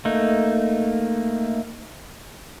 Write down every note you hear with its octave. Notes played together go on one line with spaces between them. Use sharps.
A3 A#3 D#4